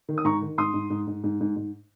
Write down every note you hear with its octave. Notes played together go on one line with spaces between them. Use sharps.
D#3
D#6
G#2 A#5 C#6
D#3
G#2 C6 D#6
G#2
G#2
G#2
G#2
G#2
G#2